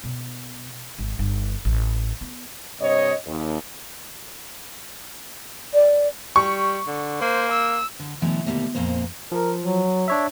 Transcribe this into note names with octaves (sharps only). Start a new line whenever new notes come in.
B2
G#1
G1
A1
B3
G2 C3 C#5 D#5
D#2
D5
G3 C#6
D3
A#3 C5
E6
D3
B2 D3 E3 F#3 A3
D2 B2 D#3 G3 A3 A#3
F2 A#2 A#3 C5
F3 A#4
F#3
D4 C#5 E5